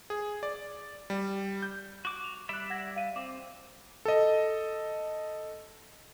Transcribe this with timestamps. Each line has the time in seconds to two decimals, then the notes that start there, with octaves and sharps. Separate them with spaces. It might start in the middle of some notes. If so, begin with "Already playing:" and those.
0.10 G#4
0.43 D5
1.10 G3
1.62 G6
2.05 F#4 D6
2.24 F7
2.49 G3 D5 E5 B5 F#6
2.70 F#5 G#6 A#6
2.96 F5 D#7
3.16 C4 D6
4.05 A4 D#5